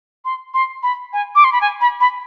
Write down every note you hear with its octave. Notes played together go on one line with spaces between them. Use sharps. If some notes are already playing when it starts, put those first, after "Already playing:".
C6
C6
B5
G#5
D6
C6
B5
G#5
B5
B5